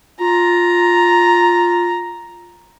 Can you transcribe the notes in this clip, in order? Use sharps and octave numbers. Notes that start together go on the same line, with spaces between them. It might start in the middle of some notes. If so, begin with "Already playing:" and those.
F4 A#5